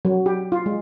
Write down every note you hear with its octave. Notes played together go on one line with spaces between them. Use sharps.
F#3
G4
F4
G#3